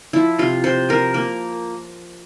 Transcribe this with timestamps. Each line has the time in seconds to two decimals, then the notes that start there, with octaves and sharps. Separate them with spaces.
0.13 F3 E4
0.38 C3 F4
0.64 C3 C5
0.89 F3 A#4
1.14 A#3 A#4